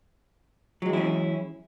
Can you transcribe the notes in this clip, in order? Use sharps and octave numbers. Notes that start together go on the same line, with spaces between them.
E3 F#3 G#3 C#4 E4